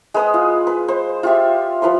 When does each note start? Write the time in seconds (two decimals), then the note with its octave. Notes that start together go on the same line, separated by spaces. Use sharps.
0.14 G#3 B4 D#6
0.34 F4
0.67 B4
0.88 C5
1.23 F4 G4 E5
1.82 F3 B4 F5 C6